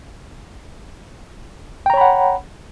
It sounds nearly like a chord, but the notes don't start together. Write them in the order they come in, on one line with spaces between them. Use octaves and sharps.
G5 A#5 C#5 B5 F#5